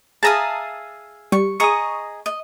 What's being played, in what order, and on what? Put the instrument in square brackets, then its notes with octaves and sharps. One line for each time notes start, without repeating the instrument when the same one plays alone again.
[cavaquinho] G#4 E5 F5 [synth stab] A5 A#5 D#6
[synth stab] G3 [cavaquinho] C#6
[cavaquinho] G#4 D#5 A#5 [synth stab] C#6 D#6
[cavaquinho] D#5